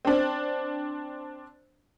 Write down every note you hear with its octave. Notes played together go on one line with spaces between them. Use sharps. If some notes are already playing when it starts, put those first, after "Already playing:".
C4 D4